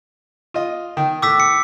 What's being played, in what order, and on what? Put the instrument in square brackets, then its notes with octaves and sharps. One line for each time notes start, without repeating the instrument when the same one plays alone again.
[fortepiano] F4 D#5
D#3
[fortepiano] A2 [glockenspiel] D6 E6 B6
[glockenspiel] C#7